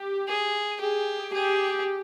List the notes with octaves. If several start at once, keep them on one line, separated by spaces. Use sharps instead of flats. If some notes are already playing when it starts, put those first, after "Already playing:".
Already playing: G4
G#4
G4 G#4
G4 G#4